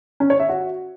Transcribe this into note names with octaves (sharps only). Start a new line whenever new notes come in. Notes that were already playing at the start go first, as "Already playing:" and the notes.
C#4
C#5
E5
F#4